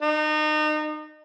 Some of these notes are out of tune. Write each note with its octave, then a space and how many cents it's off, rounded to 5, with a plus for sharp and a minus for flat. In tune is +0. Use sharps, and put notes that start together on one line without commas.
D#4 -30